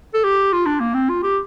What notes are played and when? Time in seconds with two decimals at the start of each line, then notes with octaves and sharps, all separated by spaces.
0.14 A4
0.24 G4
0.53 F4
0.66 D4
0.80 A#3
0.94 C4
1.09 F4
1.23 G4